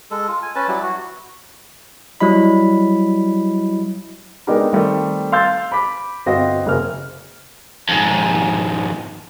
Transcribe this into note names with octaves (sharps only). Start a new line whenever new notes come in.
G#3 A4
F4
G#5
C#4 B4 A5
F#3 G3 E4
F#4
F#3 G3 E4 D#5 B5
G#3 B3 D4 D#4 G4 A#4
D#3 G3 A3 C4
F5 C6 E6 G6 A6
B5 D6 B6
G1 C4 F#4 D#5 F5 A#6
F#1 C#3 A#3 G#4 F6
F2 G#2